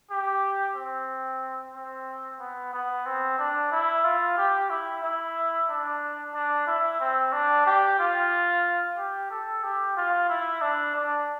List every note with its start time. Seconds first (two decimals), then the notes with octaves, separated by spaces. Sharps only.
0.11 G4
0.76 C4
1.75 C4
2.40 B3
2.73 B3
3.06 C4
3.38 D4
3.72 E4
4.04 F4
4.37 G4
4.70 E4
5.03 E4
5.69 D4
6.35 D4
6.67 E4
7.00 C4
7.33 D4
7.66 G4
7.99 F4
8.97 G4
9.31 A4
9.63 G4
9.97 F4
10.29 E4
10.61 D4
10.95 D4